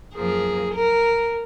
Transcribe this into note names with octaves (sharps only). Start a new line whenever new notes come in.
F#2 F3 A#3 G#4
A#4